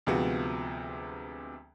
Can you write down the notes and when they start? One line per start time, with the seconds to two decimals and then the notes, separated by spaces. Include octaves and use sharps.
0.07 D2 C3 F3 G#3 B3 F#4